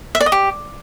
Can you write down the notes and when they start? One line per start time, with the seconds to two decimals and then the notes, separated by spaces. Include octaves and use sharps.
0.15 E5
0.20 D5
0.26 D#5
0.32 G4